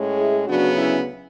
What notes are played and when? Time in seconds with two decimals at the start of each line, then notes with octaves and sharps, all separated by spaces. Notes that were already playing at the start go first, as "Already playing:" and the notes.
Already playing: A2 G#3 C#4
0.18 E4 G#4
0.47 D2 C#3 F#3 B3 D4 F#4
0.77 C#4 E4